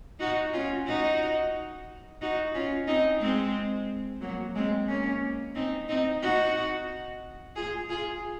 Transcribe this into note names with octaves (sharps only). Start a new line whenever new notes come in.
D#4 F#4
C#4 F4
D#4 F#4
D#4 F#4
C#4 F4
C4 D#4
G#3 C4
F#3 A#3
G#3 C4
A#3 C#4
C4 D#4
C4 D#4
D#4 F#4
F4 G#4
F4 G#4